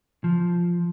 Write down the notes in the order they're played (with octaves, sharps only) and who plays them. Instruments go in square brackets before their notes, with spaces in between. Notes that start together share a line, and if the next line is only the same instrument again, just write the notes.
[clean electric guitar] F3